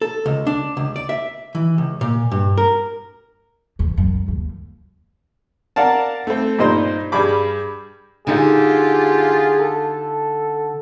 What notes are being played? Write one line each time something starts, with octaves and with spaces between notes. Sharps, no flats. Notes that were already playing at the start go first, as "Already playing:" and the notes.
A4
C#2
D4
C#2
D5
E5
E3
C#2
A#2
G2
A#4
E2
F#2
D#2
A#4 D5 F5 F#5 A5
A3 C4
G2 A#2 D#4 C5 C6
G2 G3 G#4 B5 D6
D3 D#4 F4 G4 G#4
A4